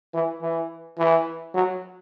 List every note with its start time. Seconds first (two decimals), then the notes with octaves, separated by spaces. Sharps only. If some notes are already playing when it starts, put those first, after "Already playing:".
0.14 E3
0.42 E3
0.98 E3
1.54 F#3